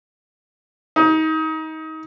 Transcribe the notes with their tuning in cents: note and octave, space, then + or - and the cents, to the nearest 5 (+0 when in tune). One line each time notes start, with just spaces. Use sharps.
D#4 +25